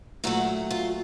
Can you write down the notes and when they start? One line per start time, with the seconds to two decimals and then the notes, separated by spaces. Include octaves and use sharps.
0.24 A#2 F#3 A3 E4 F#4
0.71 F4